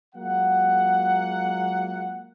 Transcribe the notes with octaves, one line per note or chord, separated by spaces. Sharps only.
F#3 G#3 A#3 F4 F#5